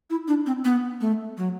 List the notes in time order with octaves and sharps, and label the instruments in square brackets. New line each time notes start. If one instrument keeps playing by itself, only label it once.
[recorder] E4
D4
C4
B3
A3
F#3